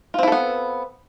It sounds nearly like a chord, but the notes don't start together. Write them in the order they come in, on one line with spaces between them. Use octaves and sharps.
F4 C4 E4 A4 B3